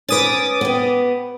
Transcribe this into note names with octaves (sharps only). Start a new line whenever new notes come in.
C#4 B4 D6 D#6 A6
B3 G4